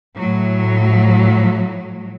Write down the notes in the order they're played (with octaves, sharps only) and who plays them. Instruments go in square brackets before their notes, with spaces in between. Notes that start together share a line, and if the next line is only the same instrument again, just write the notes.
[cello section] A2 F#3